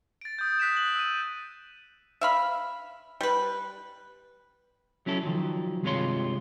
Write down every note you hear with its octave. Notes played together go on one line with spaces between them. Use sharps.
A6 D7
D#6 G6
F#6 B6 D7 E7
F#7
E6 D#7
E5 F5 B5
G3 B4
F#3 C#4 E4 A4
D#3 F3 F#3
G2 C3 G#3 F4 C#5 C6